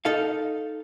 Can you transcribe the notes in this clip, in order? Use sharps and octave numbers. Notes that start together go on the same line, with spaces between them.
D#4 A4 F5